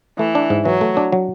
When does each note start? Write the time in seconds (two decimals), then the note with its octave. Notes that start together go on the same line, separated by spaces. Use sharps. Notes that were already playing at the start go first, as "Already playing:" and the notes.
0.19 E3 A3
0.35 D4
0.50 G#2
0.65 E3 F#3
0.81 A3
0.97 D4
1.12 F#3